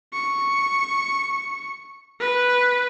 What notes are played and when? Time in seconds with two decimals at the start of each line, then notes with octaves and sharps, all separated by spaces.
0.14 C#6
2.20 B4